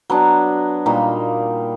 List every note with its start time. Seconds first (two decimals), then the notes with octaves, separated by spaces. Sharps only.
0.10 F#3 B3 D4
0.86 A#2 G3 A#3 D#4